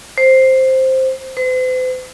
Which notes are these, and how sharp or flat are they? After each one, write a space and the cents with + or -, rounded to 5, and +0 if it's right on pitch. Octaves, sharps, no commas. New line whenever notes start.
C5 +5
C5 -45